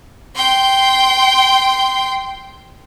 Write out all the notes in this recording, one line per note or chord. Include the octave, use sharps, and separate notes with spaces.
G5 C6